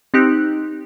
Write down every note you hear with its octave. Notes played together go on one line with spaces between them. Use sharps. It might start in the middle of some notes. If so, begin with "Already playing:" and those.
C4 D#4 G4 F#6